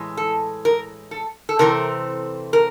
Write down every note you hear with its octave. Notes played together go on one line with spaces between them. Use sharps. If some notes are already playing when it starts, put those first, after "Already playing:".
Already playing: A2 E3 G#3
A4
A#4
A4
A4
C3 E3 A3 C4 A#4
A#4